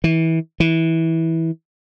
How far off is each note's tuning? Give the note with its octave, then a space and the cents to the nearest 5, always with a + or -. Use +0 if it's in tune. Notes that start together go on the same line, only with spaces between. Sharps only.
E3 -25
E3 -15